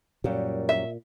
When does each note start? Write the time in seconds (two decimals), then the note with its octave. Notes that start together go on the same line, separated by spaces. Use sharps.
0.24 F#2 A#2 G3
0.69 E5